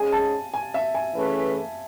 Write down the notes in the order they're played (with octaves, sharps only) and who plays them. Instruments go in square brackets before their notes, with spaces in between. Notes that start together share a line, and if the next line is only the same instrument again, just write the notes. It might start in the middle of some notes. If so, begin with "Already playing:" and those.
Already playing: [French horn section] G#2 G#3 C#4 G#4 [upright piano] G#5
[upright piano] A5
G#5
E5
G#5
[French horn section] E3 A3 C#4 G#4 B4